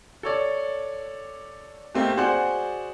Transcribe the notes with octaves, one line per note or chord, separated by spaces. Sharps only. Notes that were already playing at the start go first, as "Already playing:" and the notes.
A4 C#5 D5
A3 A#3 C4 D#4 G4
F#4 G#4 C5 D5 F#5